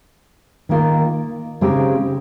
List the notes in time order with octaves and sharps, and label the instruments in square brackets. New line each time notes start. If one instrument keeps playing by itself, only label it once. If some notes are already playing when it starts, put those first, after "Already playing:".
[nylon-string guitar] D#3 A#3 F4 A#4
C#3 G#3 C4 D#4 G4